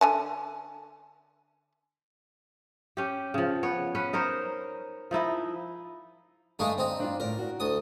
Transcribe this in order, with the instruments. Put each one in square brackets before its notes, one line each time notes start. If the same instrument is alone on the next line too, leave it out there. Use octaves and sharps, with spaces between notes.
[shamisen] D3 G#5 A5
[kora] C#4 G4
C#3 F3
B3 C#5
C#4 B4
D#4 A#4 C5 C#5
F3 D#4 E4 D#5
[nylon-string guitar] G2 F5 [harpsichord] G#3 A3 D#4
[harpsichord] C4 D#4
[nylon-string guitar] D4 F4
[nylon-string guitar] A2 F4 D5 [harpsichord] A#4
[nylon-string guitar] F#4
[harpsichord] D2 D#6